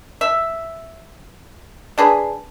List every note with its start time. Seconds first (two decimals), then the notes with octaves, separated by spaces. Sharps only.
0.21 E5
1.98 D4 G#4 B4